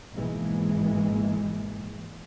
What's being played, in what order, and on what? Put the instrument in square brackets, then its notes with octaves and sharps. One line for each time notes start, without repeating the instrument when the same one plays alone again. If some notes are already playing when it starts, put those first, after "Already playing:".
[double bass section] G#1 G#2 B2 E3 G#3 A#3